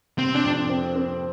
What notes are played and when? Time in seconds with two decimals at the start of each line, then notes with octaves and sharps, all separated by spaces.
0.18 C3 C4
0.35 D4
0.44 F2
0.69 C4
0.95 C4